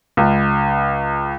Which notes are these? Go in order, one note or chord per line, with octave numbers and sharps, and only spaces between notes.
C#2